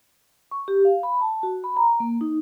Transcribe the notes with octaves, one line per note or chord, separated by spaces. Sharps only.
C#6
G4
F5
B5
A5
F#4
B5
A#5
A#3
D#4